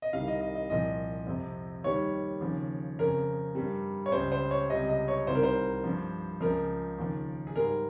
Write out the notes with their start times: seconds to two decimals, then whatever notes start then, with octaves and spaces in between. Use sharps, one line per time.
0.02 D#5
0.13 C2 C3 D#3 G3 F5
0.28 D#5
0.41 D#5
0.55 D#5
0.70 C2 A#2 F3 D#5
1.27 F2 C3 F3
1.84 D#2 D#3 G3 C#5
2.41 D#2 C#3 F3
2.99 F2 C#3 F3 A#4
3.55 G2 G3
4.06 C#5
4.12 C#2 C#3 G3 C5
4.32 C5
4.51 C#5
4.70 C#2 C3 G3 D#5
4.89 D#5
5.08 C#5
5.27 C2 C3 D#3 G3 C5
5.35 A#4
5.43 C5
5.84 G2 F3
6.41 C#2 C#3 F3 A#4
6.99 D#2 C#3 F3
7.47 G#4
7.56 G#2 G3 A#4